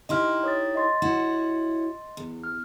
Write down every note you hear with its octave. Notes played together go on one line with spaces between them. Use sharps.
D#4 E4 G4 D#5 C6 F6
C#5 D#6 A6
D#5 C6 A6
E4 F#4 C#5
E2
F6